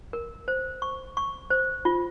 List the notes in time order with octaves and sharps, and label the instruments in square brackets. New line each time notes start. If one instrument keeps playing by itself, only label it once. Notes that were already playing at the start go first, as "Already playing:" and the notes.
[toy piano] A#4
C5
C#6
C#6
C5
F4